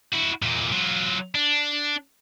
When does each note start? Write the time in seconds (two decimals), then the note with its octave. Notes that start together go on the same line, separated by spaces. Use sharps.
0.13 E4 F#4
0.42 E2 A#2
0.72 F#3 F4
1.35 D4